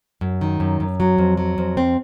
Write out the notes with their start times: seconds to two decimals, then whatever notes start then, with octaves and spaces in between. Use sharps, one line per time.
0.21 F#2
0.41 D#3
0.60 F#2
0.80 F#2
1.00 F#3
1.18 F2
1.37 F#3
1.58 F2
1.77 C4